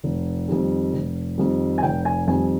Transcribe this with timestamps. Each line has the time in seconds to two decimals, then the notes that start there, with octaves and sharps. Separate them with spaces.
0.04 F1
0.49 F2 D#3 G3
0.93 F1
1.38 F2 D#3 G3
1.78 G#5
1.83 F1 G5
2.05 G#5
2.28 F2 D#3 G3 G#5